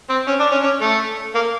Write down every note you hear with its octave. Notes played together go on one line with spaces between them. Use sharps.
C4
C#4
D4
C#4
C#4
A3
A#3